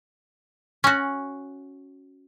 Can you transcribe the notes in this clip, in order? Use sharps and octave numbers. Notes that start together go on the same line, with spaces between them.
C#4 F#4